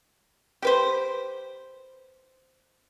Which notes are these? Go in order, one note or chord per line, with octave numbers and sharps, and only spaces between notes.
G4 B4 C5